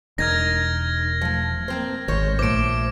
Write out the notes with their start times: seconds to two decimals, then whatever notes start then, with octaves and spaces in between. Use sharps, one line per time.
0.18 E1 D#4 A#4 F6 G#6 A#6
1.21 F3 A3
1.68 A#3 C4 C5
2.08 G#1 G#2 C5 C#5
2.39 A#1 A3 C5 D6 D7